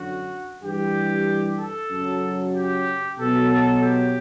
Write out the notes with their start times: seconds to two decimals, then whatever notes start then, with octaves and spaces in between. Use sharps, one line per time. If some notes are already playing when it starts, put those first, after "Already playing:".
Already playing: F#2 D3 F#3 F#4
0.63 G2 E3 G3 G4
1.60 A4
1.91 F#2 C#3 F#3
2.55 G4
3.19 B2 F#3 A4
3.51 A4
3.82 G4